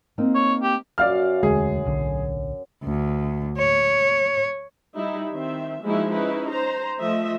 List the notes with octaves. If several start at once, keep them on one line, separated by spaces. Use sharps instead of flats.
A#3 C4 D#4
C#5
G4
F#2 D5 F5 F6
E1 D2 G#3 G#4
D1 B1 D3
D2
C#5
G3 D#4 E4
D#3 C4 E5
F3 G#3 A#3 D#4 E4 F#4
C#4 D#4 E4 B4
C5 A#5
F3 A3 D#5 E5